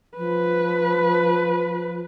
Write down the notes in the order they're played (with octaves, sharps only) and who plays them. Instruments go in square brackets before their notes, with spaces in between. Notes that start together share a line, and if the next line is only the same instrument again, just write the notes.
[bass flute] F3 [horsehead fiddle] B4